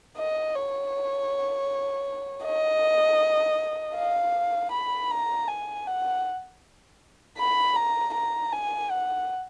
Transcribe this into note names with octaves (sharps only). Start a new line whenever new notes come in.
D#5
C#5
D#5
F5
B5
A#5
G#5
F#5
B5
A#5
A#5
G#5
F#5